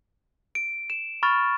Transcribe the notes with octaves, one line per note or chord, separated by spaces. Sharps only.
D7
E7
B5 C#6 F6 A6